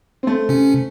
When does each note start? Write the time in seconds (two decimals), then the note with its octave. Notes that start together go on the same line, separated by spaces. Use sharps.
0.23 A3 C4
0.49 C3 C#4